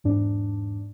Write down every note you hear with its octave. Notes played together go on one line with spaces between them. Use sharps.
E2 G#2 D4